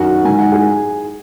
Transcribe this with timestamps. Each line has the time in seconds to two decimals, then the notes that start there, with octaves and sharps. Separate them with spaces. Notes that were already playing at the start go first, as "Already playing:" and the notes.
Already playing: F#2 D#3 F#4 F#5
0.25 G#2 D#3 G#5
0.39 F#5
0.52 G#4 G#5